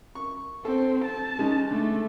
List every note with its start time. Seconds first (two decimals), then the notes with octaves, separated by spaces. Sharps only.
0.15 C#6
0.65 C4 A4
1.05 A5
1.39 G#3 C#4 D#4
1.71 D3 A3